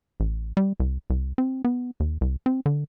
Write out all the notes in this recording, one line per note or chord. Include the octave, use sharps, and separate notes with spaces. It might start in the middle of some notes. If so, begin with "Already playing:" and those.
A1
G3
C2
C2
C4
B3
D#2
C2
C4
D3